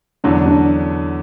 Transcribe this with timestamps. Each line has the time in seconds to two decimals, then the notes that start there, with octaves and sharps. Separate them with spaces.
0.24 E2 D3 F#3 D4
0.46 D4